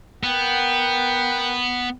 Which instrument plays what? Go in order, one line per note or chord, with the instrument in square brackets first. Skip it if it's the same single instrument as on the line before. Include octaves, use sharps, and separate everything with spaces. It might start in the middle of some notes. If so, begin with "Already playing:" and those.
[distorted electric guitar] B3 [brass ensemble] A#4 F#5 G5